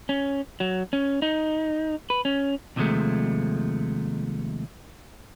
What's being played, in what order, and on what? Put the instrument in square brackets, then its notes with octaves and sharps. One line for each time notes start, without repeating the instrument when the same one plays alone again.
[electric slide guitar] C#4
F#3
C#4
D#4
B4
C#4
[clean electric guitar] D#2 C3 F3 F#3 G#3 A3